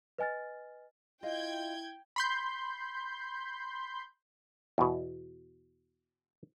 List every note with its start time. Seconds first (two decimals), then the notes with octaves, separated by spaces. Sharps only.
0.18 B4 D#5 G#5 F6 A6
1.23 E4 F4 D#5 F5 G5 G6 G#6
2.16 B5 C6 G6
4.78 E2 B2